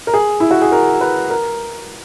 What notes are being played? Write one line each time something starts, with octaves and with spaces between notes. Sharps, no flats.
A#4
G#4
E4
F#4
G#4
A#4
B4
A#4